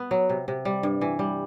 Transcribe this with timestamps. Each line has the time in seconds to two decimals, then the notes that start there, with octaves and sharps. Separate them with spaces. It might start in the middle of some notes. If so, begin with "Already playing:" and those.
Already playing: B3
0.11 F#3
0.29 C3
0.48 C3
0.65 G3
0.83 G2
1.01 E3
1.19 G3